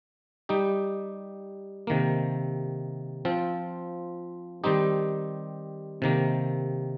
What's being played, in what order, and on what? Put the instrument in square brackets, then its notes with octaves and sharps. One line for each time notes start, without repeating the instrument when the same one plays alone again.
[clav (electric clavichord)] G3 D#4 G4
C3 D#3 A#3
F3 C4 F4
D#3 G3 C4 D#4 G4
C3 D#3 A#3